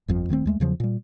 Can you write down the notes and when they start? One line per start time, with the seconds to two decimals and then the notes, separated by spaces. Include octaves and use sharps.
0.08 G1 F2 F3
0.29 D#1 D#3 A3 C4
0.46 D#2 G#3 A3
0.60 E2 C#3 F3 F#3
0.80 A#2 G3